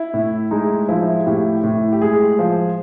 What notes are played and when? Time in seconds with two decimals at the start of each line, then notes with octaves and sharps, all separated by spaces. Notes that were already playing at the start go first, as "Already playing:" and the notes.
Already playing: E4
0.14 A2
0.51 G#3 D#4
0.89 F3 E4
1.19 G#4
1.26 A2 G4
1.63 A2
1.92 G4
2.01 G#3 G#4
2.39 F3